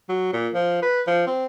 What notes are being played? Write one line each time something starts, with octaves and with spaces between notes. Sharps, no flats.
F#3
A#2
F3
B4
F3
C4